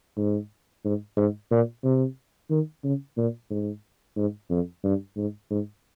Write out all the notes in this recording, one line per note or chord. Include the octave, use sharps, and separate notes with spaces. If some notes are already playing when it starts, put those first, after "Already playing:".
G#2
G#2
G#2
A#2
C3
D#3
C#3
A#2
G#2
G#2
F2
G2
G#2
G#2